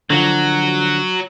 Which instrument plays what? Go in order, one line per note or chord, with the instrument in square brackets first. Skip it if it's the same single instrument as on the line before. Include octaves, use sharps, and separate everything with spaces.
[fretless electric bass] D3 F3 [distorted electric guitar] F#3